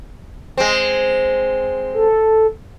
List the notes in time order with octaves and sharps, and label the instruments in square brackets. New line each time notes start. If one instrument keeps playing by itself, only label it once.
[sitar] G#3 C4
[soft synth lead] A4